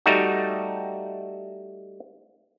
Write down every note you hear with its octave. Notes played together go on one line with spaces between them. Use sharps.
G3 A3 D#4 F#4